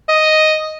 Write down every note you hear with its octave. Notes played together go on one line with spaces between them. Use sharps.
D#5